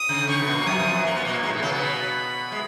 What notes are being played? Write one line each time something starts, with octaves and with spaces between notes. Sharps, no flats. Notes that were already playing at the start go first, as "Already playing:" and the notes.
Already playing: D#6
C#3 C#4
C#3 C#4 C#6
B2 B3
A#2 A#3
F#2 F#3 D#6
F2 F3
F#2 F#3
A#3 C#6
B3
A#2 A#3
G#2 G#3
B2 B3
C#3 C#4
B2 B3
B5
G#3